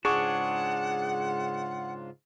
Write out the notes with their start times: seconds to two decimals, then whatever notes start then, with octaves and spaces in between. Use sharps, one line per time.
0.05 G#2 C#3 D4 F4 G#4 F#5 C#6